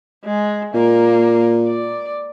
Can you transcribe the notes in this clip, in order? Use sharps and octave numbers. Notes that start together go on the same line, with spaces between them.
G#3
A#2 A#3
D5